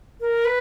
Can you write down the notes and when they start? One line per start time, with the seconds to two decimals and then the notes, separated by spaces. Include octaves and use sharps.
0.20 A#4
0.45 B4